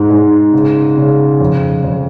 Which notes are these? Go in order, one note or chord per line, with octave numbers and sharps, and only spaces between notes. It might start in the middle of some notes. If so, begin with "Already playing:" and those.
Already playing: G#2
G#2
C#3
C#3
F2
F2